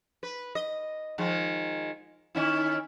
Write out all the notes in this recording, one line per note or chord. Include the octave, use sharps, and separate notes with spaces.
B4
D#5
D#3 F3 G#3
D#3 C#4 E4